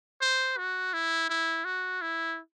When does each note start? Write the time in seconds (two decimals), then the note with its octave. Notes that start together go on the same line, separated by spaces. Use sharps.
0.22 C5
0.58 F#4
0.93 E4
1.29 E4
1.65 F#4
2.02 E4